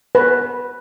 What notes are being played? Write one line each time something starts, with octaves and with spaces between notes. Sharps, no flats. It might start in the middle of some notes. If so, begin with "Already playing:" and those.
B4